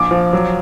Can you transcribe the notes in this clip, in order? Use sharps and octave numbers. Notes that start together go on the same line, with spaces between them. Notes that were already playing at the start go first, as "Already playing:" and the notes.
Already playing: A#1 D6
F3
F#3